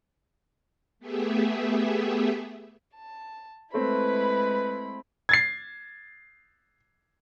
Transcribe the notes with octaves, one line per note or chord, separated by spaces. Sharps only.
A3 B3 G4 G#4 E5
A5
G#3 A3 C4 E4 B4 B5
G#6 A6 C7